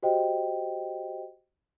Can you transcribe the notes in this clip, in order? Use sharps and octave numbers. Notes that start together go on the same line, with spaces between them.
F#4 G4 C5 D#5 G5